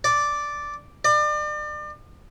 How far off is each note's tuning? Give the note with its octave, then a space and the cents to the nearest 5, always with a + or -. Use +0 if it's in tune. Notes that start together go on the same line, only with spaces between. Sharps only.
D5 -5
D5 +35